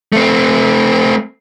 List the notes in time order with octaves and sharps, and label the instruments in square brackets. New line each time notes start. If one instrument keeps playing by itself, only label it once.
[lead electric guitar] A3 C4